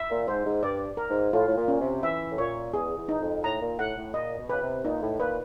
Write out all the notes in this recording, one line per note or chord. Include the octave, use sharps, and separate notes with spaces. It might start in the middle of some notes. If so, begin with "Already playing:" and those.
Already playing: E5
A#2
G#2 C5
G#2
G2 D5
A#4
G#2
A2 F4
A2
A#2
C#4
C3
E3 E5
A2
A#2 C#5
E2 G#4
E2
D#4
F2
A2 A#5
A#2
A2 F#5
A2
A#2 D#5
B2
C#3 B4
C3
A#2 D#4
A2
A#2 B4